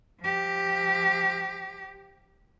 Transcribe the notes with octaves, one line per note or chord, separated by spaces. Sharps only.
F3 G4